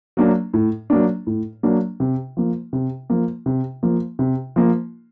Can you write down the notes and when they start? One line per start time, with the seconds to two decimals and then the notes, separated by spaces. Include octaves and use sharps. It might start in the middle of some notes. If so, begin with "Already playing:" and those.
0.17 F#3 A#3 D4
0.54 A2
0.90 F#3 A#3 D4
1.27 A2
1.63 F#3 A#3 D4
2.00 C3
2.37 F3 A#3
2.73 C3
3.10 F3 A#3
3.46 C3
3.83 F3 A#3
4.19 C3
4.56 F3 A#3